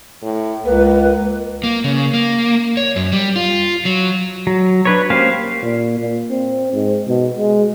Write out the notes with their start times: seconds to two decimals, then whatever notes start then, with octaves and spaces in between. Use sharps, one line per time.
0.23 A2
0.65 C#2 A#3 B4
1.64 A#3
1.84 C#3
2.14 A#3
2.77 C#5
2.96 F#2
3.12 G3
3.36 F4
3.85 F#3
4.47 F#3
4.85 D4 B4 C#5
5.10 A#3 C#4 G4 C5 F5
5.63 A#2
5.99 A#2
6.30 C4
6.73 G#2
7.08 B2
7.37 G#3